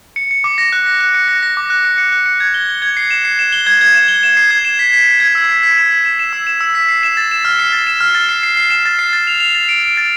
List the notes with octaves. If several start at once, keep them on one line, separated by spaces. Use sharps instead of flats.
C#7
C#7
D6
A#6
F#6
A#6
F#6
C#7
A#6
A#6
D6
F#6
C#7
C#7
F#6
C#7
G#6
G7
G7
G#6
C7
E7
C7
E7
G7
G#6
G#6
E7
G7
E7
C7
G#6
E7
B6
B6
E7
G#6
E6
B6
B6
E7
B6
E7
E7
E6
E7
E6
B6
C7
E7
A6
E7
F6
C7
A6
E7
F6
A6
C7
C7
C7
E7
A6
C7
A6
F7
F7
A6
D7
D7
A6